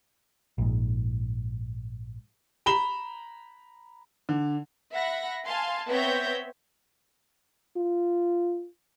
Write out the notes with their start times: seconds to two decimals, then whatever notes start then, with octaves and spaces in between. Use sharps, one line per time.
0.58 A#1 G#2
2.66 A#5 B5 E7 G7
4.29 D3
4.93 E5 F#5 B5 A#6
5.45 F5 G#5 A5 C6
5.89 B3 C4 C#5 E5 G6 A#6
7.76 F4